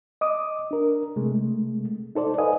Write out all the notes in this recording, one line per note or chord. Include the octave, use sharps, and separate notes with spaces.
D#5 D6 D#6
D4 A#4
C3 G#3 A3
D#4 A4 C5 D5
B4 D#5 F5 G#5 D#6